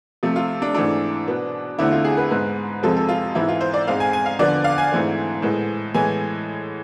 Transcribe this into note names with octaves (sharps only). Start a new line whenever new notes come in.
C3 F3 A3
F4
D4
G#2 E3 A3 D4
B2 B3
E2 D3 A3 C4 E4
F4
G#4
B4
G#2 G#3 B3
F2 C3 F3 G#3 C4 A4
A4
F4
G#2 E3 B3 E4
F4
C5
D5
G#2 G#3 C4 F5
G#5
G#5
F5
E2 D3 F3 B3 D5
F5
G#5
G#2 E3 A3 C4
A2 G#3 B3
A2 E3 G#3 B3 G#5